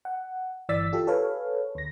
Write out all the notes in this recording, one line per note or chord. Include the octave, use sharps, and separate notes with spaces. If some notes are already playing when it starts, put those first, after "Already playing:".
F#5
G1 E3 D5 E6 A6 B6
F4 G4 A4
G#4 A4 B4 C#5 F5
D2 A#6